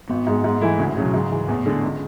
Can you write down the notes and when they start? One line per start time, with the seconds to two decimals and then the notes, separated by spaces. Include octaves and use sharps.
0.09 G#1 B3
0.27 G#2 G#3
0.44 G#2 B3
0.61 E3 G#3 A3 E4
0.79 D2 C#3
0.88 G#2
0.96 A2 C#3 F#3
1.05 B2
1.13 G#2 C#3
1.31 E3 G#3
1.48 E2 A2
1.66 D3 G#3
1.82 C#2